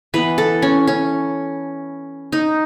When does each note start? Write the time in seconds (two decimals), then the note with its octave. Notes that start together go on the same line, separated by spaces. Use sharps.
0.14 E3 B3 B4
0.38 A4
0.62 C#4
0.87 C#4
2.32 D#4